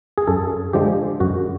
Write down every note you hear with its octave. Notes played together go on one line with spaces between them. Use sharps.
G#4
F#2 A4
D3 F3 G#3 G4
F#2 F#4